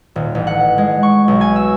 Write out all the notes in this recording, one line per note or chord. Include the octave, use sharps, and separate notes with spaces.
D#1
A1
F#5
G#3
C#6
B1
G#5
E6